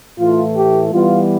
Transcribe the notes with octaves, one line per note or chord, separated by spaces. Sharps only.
A2 E3 A3 F4
G4
E3 G3 B3 F4